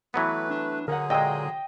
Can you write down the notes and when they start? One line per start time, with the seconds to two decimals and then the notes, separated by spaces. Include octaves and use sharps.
0.14 E3 F#3 A3 B3 B4
0.50 D4
0.88 D3 F#3 G#4 A#4 F#5
1.10 A#2 G#3 D#5 G5 E6